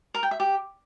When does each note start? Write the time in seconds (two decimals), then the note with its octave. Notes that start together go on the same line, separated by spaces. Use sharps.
0.15 A#4
0.23 G5
0.31 E5
0.40 G4